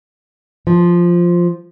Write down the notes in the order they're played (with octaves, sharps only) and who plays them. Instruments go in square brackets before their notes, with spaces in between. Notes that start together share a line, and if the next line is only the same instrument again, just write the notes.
[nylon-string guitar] F3